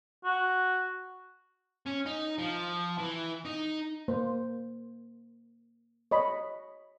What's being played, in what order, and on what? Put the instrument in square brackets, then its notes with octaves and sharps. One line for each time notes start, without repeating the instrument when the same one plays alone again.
[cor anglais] F#4
[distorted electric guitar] C#4
D#4
F3
E3
D#4
[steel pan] A#3 C5
C#5 D#5 B5